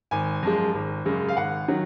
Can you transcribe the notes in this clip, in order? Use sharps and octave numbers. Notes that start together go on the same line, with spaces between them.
G#1 G#5
F#2 F3 G#3
G#1
F#2 C#3 G#3
F5
G#1 F#5
D#3 F#3